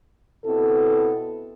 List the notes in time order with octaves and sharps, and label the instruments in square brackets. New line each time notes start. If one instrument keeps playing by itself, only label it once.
[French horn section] B2 B3 C4 E4 A4